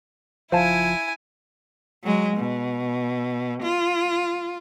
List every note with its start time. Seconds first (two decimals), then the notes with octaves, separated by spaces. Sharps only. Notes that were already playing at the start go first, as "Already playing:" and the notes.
0.52 F#1 F3 E4 C5 F5 G#5 A5
2.03 F#3 G#3
2.37 B2
3.63 F4